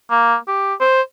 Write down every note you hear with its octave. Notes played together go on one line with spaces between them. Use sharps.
A#3
G4
C5